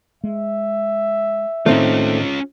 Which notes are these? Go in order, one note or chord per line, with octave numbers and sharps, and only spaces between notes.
G#3 E5
A2 D#3 A3 C4 C#4 D#4 F4